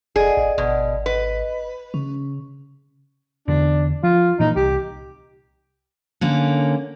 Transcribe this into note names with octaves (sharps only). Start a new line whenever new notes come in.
F1 G#4 D5 D#5 F#5
A1
G#1 B2
B4 D#5
C#3 C#4
E2 D3 D4
F3 F4
A#2 E3 A#3 D#4
C2 G4
D3 A#3 C#4